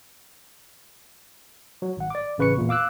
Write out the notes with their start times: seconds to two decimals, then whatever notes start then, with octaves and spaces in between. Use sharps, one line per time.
1.82 F#3
1.97 G#1 F#5
2.10 D5 D6
2.38 A1 C#3 B4 C#6 C#7
2.56 E2 A#2
2.69 F5 D6 E6 F#6